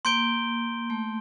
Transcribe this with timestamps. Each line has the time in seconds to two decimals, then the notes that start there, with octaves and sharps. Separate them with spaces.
0.05 A#3 C6 G6 D7 G7
0.90 A3